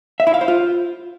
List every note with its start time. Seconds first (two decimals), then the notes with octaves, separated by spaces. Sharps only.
0.20 E5
0.27 E4
0.34 F5
0.41 C5
0.48 F4